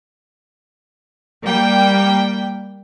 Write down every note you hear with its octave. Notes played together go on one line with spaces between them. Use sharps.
G3 A#3 G5